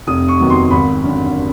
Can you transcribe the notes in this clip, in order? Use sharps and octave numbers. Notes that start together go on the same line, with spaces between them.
F1 D#6
C#6
D#2 D#3 F#3 B3
C6
G#1 B5
F#2 D3